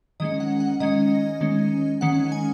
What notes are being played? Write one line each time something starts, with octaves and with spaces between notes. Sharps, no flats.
D#3 G#3 C#4 D#5
F#5
F#5
D#3 G#3 C#4 D#5
D#3 G#3 C#4
D#3 G#3 C#4 F#5
G#5